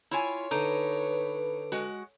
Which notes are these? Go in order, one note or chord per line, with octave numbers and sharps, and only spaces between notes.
E4 F4 C#5 G#5
D3 D#4 B4
G#3 F#4